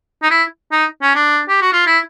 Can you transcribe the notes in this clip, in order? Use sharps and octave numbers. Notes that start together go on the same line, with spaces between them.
D#4
E4
D#4
C#4
D4
G4
F#4
F4
E4